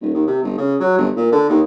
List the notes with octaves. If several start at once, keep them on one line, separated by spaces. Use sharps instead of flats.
D#1
D#2
C3
G1
C#3
F#3
G1
A#2
D3
D#2